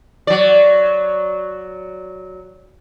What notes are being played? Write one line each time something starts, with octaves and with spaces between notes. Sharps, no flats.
F#3 D5